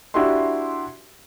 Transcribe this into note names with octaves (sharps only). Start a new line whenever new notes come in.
D4 E4 F#4 G4 E5 C6